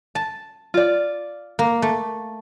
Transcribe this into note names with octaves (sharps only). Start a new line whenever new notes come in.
A5
F4 D5
A#3
A3